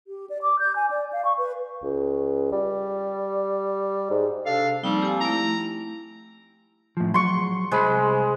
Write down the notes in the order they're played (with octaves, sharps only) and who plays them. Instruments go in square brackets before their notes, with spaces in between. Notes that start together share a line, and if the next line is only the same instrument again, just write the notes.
[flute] G4
D5
D6
G6
G#5
D5
F5
C#6
B4
[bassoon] C#2
G3
G#2
[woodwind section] C3 D4 A4 [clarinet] F5
[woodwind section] F3 A#3 C4 [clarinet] G3 [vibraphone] D#4
[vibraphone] G4 G#5
[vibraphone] A3 E4 [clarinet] A#5
[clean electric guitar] A2 F3
[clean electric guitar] F#3 [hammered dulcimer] C6 C#6
[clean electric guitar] C2 C5 B5 [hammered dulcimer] G#3